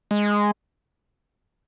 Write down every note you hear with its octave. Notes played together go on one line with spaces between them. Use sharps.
G#3